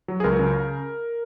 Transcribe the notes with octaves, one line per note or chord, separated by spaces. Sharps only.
F#3
G#4
C#2 A#4
C#3